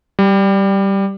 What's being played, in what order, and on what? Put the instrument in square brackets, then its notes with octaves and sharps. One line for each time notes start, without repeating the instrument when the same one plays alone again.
[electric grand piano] G3